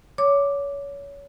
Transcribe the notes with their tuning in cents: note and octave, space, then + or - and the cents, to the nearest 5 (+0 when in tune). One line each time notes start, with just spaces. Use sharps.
C#5 +25 D6 +0